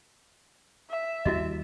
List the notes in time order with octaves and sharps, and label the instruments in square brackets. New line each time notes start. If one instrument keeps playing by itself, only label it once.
[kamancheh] E5
[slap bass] D#2 G3 [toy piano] E4 F#4 D#5